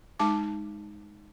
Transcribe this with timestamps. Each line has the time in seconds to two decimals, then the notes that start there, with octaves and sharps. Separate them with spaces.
0.19 G#3 D#4 A5 D6